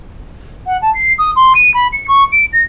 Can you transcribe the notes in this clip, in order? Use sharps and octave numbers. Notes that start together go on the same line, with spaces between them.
F#5
A5
C7
D#6
C6
D#7
B5
C#7
C#6
D7
A#6